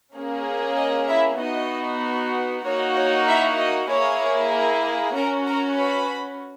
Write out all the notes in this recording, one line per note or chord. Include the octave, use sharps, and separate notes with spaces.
A#3 C#4 G#4
D#5
E4 E5
B3 D#4 F#4 D#5
A#3 D#4 F#4 C#5
C#5
E4 E5
D#5
A#3 E4 G#4 C#5
C#4 F#4 A#4 A#5
A#4 A#5
B4 B5